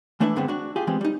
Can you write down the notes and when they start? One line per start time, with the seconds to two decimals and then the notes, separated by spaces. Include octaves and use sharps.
0.20 E3 A3 D4 E4 B4 E5
0.36 G2 D3 G#3 B3 C4 D4
0.48 D4 F#4
0.76 F4 G4 G#4
0.87 E3 G3 G#3 B3 C4
1.01 G3 D#4